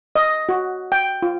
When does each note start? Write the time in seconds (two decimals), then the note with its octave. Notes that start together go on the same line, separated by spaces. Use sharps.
0.16 D#5
0.49 F#4
0.92 G5
1.22 F4